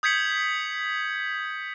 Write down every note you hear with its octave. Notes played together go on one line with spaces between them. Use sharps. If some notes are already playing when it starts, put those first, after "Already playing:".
D#6 G6 G#6 B6 C#7 F#7